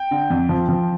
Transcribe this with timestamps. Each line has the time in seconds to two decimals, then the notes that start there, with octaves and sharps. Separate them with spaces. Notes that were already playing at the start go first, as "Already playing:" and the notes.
Already playing: G5
0.11 D3
0.30 F2
0.49 F3
0.69 F3